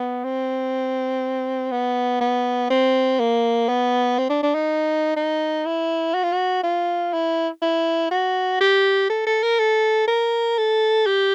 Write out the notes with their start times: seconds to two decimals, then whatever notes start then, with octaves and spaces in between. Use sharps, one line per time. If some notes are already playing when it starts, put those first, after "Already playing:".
Already playing: B3
0.24 C4
1.71 B3
2.21 B3
2.70 C4
3.20 A#3
3.69 B3
4.18 C4
4.30 D4
4.43 D4
4.55 D#4
5.16 D#4
5.66 E4
6.14 F#4
6.24 F4
6.32 F#4
6.63 F4
7.13 E4
7.62 E4
8.11 F#4
8.61 G4
9.10 A4
9.27 A4
9.43 A#4
9.59 A4
10.08 A#4
10.58 A4
11.06 G4